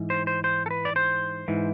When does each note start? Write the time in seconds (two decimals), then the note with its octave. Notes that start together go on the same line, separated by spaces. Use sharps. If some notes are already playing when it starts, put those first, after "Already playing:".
Already playing: G#2 E3
0.10 C5
0.27 C5
0.44 C5
0.66 A4
0.71 B4
0.85 D5
0.96 C5
1.48 G#2 E3